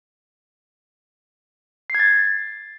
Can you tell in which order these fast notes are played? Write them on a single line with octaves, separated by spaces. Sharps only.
C7 G#6 A6